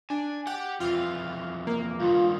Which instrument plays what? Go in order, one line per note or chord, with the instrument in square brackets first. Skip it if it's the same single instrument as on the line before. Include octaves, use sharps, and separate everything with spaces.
[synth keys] D4 [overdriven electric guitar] G#5
[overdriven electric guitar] G4 G5 [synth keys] F#5
[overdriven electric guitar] F2 E3 [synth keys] F4 F5
[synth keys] A#3
[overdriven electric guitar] G2 D#3 [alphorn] F4